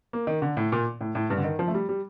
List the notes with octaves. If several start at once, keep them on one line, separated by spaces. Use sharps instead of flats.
A#3
D#3
D3
A2
A#2
A2
A2
G2
D3
D#3
F3
A3
G3
G3